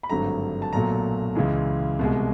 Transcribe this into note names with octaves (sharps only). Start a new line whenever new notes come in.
B5
G#1 G2 D3 F#3 A3 A#5
A5
B1 A#2 F#3 A3 A#5
C#2 C#3 E3 G#3
C2 B2 G#3